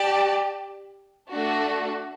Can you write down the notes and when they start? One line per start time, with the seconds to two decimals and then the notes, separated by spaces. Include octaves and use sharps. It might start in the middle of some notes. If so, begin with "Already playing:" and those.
Already playing: G4 D5 A5
1.32 A3 D4 F#4